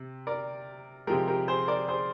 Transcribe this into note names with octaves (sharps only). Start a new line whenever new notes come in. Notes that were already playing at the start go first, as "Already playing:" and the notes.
Already playing: C3
A#4 D5
C3 F3 G#3 G4 A#4
G4 A#4
G#4 C5
A#4 D5
G#4 C5